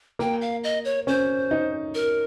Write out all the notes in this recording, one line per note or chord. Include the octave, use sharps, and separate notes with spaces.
A#3 G5
F5
D#5
C#5
C#4 C5
D#4
A#4